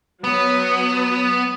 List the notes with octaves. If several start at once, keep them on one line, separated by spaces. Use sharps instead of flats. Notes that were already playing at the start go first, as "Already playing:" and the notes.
F#3 B3